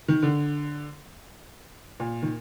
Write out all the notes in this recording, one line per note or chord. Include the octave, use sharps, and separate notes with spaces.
D#3
D3
A#2
D#3